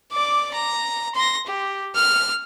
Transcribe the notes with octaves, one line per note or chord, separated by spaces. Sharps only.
D5 D6
A#5
C6 A#6
G4
F6